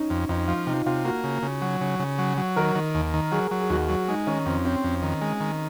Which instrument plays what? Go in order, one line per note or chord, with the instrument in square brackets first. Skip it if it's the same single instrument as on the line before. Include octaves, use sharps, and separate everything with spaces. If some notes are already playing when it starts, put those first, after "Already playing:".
Already playing: [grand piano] C#4 D#4
[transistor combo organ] F2
[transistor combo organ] F2 [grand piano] D#4
[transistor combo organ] F3 [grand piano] F4
[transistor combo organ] C3 [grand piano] D#4
[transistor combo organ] C3 [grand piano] F4
[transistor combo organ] A#3 [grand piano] F#4
[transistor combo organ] C#3
C#3
F#3
C#3
C#3
F#3
F#3
[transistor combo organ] D#3 [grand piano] A#4
[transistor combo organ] D#3
D#2
D#3
[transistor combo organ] F#3 [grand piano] G#4
[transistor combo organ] F#3
[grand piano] G#4
[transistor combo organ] D#2 [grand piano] F#4
[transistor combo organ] F#3
[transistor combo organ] G#3 [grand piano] D#4
[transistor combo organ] D#3 [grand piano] C#4
[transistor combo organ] F2 [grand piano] C4
[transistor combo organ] C4 [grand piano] C#4
[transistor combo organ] F2
D#3
G#3
D#3